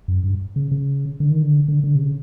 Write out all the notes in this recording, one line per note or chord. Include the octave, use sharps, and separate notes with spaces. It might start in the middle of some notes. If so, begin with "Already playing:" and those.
F#2
G2
C#3
C#3
D3
D#3
D3
D3
D3
C3
C#3